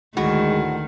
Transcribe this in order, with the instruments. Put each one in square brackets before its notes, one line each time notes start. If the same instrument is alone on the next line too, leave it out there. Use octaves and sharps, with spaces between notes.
[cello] D2 [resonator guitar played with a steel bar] A2 F#4 [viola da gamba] D#3 [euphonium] G#3